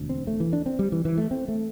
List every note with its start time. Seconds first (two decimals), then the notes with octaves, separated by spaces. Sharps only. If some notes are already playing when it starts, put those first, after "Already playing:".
Already playing: E1 D2 D3
0.09 C4
0.27 A3
0.40 E3
0.53 D4
0.66 C4
0.79 G3
0.92 E3
1.05 E3
1.17 A3
1.31 C4
1.48 A3